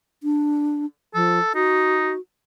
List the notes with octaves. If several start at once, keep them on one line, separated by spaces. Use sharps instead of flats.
D4
F3 A4
D#4 F#4